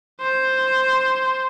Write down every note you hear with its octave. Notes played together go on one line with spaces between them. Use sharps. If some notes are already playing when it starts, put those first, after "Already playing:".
C5